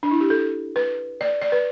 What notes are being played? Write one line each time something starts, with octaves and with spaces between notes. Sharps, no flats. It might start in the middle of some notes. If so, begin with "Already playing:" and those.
D4
E4
G4
A4
B4
D5
D5
B4